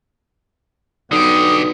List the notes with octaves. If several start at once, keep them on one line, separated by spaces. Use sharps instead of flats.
B1 D3 B3 G4 D#6